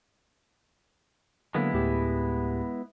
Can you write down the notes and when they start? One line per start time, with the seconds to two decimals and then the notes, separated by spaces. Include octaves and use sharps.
1.55 D3 F#3 G#3 A#3 B3 E4
1.74 D2 A2 G4